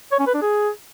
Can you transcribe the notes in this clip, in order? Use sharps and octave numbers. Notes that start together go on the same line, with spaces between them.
C#5
C#4
B4
D4
G#4